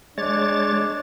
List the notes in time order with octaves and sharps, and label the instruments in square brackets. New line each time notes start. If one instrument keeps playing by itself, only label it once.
[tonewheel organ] G#3 C#5 A6 [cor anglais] D4